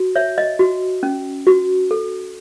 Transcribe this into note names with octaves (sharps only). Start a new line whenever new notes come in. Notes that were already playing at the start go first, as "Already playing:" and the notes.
Already playing: F#4
C#5 E5
D#5
F#4
C#4
F#4
A4